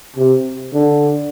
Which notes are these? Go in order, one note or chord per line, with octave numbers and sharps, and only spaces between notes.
C3
D3